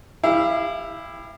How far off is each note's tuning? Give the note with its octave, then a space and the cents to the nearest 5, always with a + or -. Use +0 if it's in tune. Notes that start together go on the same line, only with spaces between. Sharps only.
E4 +0 G4 +30 F5 -25